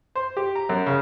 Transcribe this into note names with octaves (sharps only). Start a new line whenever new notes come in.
C5
G4
A#5
F#2
C#3